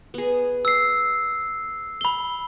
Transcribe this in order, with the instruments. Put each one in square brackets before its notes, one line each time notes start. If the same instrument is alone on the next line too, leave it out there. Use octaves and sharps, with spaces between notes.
[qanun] B3 G#4
[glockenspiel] E6 C7
B5 G7